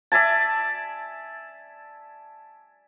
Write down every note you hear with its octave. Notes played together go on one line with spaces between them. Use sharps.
D5 E5 G#5 A5